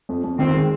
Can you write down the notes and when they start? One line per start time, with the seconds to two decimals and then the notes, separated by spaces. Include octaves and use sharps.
0.09 F2
0.24 F2
0.39 D#3 C4
0.54 G#3